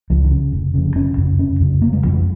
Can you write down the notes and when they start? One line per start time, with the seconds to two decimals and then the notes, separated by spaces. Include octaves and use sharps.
0.10 C#2 F3
0.24 D#3
0.31 C#3
0.52 F1
0.74 F2 C#3
0.96 F1 C#4
1.17 F2 C#3
1.39 F1 C#4
1.60 F2 C#3
1.82 F1 A#3
1.93 G#3
2.03 C#3 F3
2.06 F2
2.14 G#3